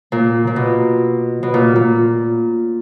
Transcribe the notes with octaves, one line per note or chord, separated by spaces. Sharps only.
A#2
A#2
B2
B2
A#2
A#2